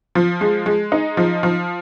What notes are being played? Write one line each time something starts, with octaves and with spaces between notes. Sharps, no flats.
F3
G#3
G#3
D#4
F3
F3